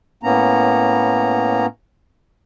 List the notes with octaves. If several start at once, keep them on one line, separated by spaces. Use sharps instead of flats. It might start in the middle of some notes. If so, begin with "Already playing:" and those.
A2 A#3 B3 C#4 A#5